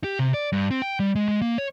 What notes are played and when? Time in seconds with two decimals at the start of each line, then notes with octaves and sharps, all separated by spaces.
0.04 G4
0.19 C3
0.34 D5
0.52 G2
0.71 C4
0.82 G5
1.00 G3
1.15 G#3
1.28 G#3
1.42 A#3
1.58 C#5